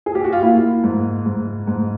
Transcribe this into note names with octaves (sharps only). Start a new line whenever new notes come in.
G#4
G4
F#4
F4
A#3 E4
G#2
G#2
G#2